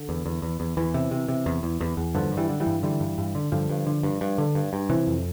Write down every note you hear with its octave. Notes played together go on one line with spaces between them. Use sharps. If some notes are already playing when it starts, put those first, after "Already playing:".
Already playing: D3
E2
E2
E2
E2
E2 E3
C3
C3
C3
E2
E2
E2
E2
G2 D3 F3
G2
E3 G3
D3
E3 G3
G2
D3 E3 G3
G2
G2
D3
G2 D3 F3
G2
D3
G2
G2
D3
G2
G2
C3 E3
F2